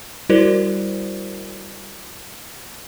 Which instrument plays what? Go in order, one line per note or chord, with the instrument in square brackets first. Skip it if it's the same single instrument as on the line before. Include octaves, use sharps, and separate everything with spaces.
[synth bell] G3 E4 F#4 A#4 C5 D5